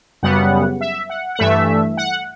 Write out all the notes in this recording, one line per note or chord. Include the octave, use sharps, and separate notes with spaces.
F#2 C#3 G3 B3 F#5
E5
F#5
F#5
G2 E3 A3 E5
F#5